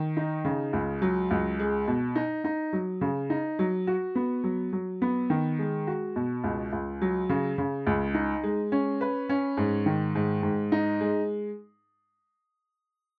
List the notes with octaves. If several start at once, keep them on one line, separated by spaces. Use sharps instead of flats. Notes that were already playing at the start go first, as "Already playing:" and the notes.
Already playing: D#3
D#4
C#3
C#2
F#3
C#2
G#3
B2
D#4
D#4
F#3
C#3
D#4
F#3
F#4
B3
F#3
F#3
B3
D#3
G#3
F#4
B2
C#2
C#2
F#3
C#3
C#3
C#2
D#4
G#3
C#4
B4
C#4
G#2
D#3
G#2
G#2
D#4
G#3